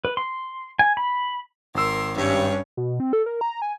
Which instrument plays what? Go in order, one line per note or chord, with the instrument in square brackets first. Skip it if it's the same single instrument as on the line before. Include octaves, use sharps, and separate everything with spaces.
[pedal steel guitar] B4
C6
G#5
B5
[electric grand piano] G#1 E6 [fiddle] A#4 C6
[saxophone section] G2 [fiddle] C#4 C#5
[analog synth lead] B2
C4
A4
A#4
A#5
G#5